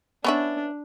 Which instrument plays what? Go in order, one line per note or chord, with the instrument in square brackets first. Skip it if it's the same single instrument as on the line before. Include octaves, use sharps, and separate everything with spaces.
[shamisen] B3 C#4 E4 [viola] D4